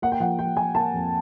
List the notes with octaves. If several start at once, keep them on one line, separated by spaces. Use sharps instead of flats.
A#3 F#5
G5
F3 F#5
F3 G5
F3 G#5
A#3 A5
F2